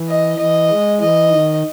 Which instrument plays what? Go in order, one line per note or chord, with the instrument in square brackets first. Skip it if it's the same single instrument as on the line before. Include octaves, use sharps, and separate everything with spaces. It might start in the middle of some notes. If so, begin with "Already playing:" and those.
Already playing: [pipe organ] E3
[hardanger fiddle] D#5
[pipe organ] E3 [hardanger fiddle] D#5
[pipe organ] G#3
[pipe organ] E3 [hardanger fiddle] D#5
[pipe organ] D#3